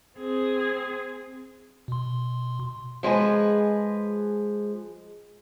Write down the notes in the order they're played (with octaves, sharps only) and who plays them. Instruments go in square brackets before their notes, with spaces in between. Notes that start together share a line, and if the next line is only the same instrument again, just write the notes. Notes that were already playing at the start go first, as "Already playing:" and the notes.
[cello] C4 G#4
[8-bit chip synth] B2 C6
[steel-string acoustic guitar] F3 G#3 G#4 B4